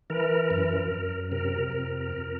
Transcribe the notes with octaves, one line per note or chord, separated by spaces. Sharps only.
E3 A#4
F#2
F#2
C3 A#4
F2
F2